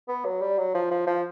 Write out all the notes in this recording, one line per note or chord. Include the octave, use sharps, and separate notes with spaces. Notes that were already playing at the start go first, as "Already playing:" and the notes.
B3
F#3
G3
F#3
F3
F3
F3